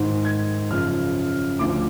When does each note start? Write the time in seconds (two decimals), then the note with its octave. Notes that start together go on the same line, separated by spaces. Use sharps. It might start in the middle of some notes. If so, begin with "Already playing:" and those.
Already playing: G#2 D#3
0.25 G#6
0.70 F#2 C#3 F3 F6
1.59 D2 D3 F3 D6